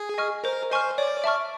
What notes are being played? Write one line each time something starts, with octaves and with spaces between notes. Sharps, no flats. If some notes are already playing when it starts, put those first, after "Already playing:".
Already playing: G#4
D#5 G#5 C#6 F6
A#4 C5
C5 D#5 G#5 C#6 F6
C#5 D5
E5 A5 C#6 F6